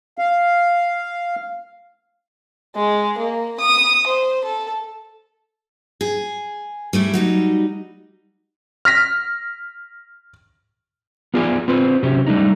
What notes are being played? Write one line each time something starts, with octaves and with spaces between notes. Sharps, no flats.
F5
G#3
A#3
D#6
C5
A4
G#4
G3 A3 E4
F#3 G3 D#4
F6 A#6 B6
B3 F4 G#4 D5 G#5
C4 F4 B4 C5
C3 F#3 C4 C#4 G4
G3 A3 D4 D#4